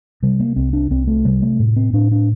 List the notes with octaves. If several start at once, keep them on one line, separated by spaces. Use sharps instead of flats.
C3 G3
A#3
C2 C4
D4
C2 C4
A3
C3 G3
A3
A2
C4
A2 D4
D4